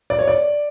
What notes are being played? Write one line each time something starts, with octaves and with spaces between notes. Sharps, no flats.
D5
C#5
D5